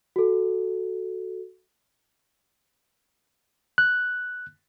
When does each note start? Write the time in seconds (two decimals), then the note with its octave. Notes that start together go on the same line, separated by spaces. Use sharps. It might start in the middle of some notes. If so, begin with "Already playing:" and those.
0.16 F#4 A4
3.78 F#6